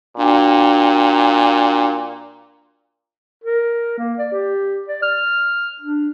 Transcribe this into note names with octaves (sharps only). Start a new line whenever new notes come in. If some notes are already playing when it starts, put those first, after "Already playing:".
A#2 D4 F#4 G5
A#4
A#3
D5
G4
D5
F6
D4